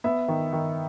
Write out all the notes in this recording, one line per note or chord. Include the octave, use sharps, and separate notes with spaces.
B3 E5
D#3
D#3